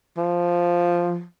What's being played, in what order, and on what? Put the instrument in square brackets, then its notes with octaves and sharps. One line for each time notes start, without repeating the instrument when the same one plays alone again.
[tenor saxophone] F3